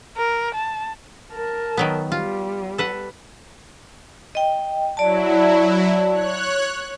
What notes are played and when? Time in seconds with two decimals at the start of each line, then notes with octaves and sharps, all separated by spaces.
0.17 A#4
0.55 A5
1.33 A#4 A5
1.77 D#3 F#3 B3
2.12 G3 F4
2.78 A4 B4 F#5
4.35 D#5 G5
4.97 F#3 E4 D5 A5
6.11 C#5 F#6